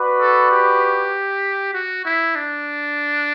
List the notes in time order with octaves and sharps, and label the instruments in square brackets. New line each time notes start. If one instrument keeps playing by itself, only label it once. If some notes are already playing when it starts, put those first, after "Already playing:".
Already playing: [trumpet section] F#4 B4 D5
[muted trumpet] A4
G4
F#4
E4
D4